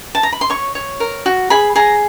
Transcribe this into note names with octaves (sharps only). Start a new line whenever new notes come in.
A5
A#5
B5
C6
C#5 C#6
C#5
A#4
F#4
G#4 B5
G#4 A#5